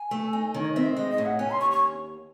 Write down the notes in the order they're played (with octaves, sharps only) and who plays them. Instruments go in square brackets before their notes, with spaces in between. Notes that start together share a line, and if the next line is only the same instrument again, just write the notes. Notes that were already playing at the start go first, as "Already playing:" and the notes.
Already playing: [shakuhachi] G#5
[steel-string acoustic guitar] A3
D#4
[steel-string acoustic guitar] D#3 [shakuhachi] C#5
[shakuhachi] D#5
[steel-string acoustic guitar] C4 [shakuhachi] E5
[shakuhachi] D#5
[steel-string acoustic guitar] G#3 [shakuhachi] D#5
[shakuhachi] D#5
[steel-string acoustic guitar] A2
[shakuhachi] F#5
[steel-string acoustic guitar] C#4 [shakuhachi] G#5
[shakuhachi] C6
[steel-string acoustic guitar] D#2 [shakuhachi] C#6
[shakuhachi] C#6